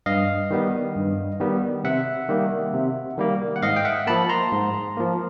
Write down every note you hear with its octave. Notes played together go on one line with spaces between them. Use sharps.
G2 D#5 F5
D#3 G3 B3
G2
D#3 G3 B3
C3 E5 F#5
D#3 G3 A#3
C3
D#3 G3 A#3
F#5
G#2 D#5 F5
G5
E5 F#5
F3 A#3 A5 B5
A#5 C6
G#2
F3 A#3